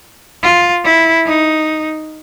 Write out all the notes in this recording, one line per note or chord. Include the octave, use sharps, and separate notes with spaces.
F4
E4
D#4